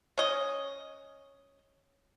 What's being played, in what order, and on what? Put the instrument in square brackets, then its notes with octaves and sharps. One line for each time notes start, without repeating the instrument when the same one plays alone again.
[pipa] C#4 D#5